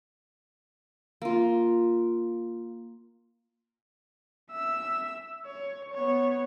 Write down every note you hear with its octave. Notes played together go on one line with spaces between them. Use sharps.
A#3 F4
E5 E6
C#5
B3 C#5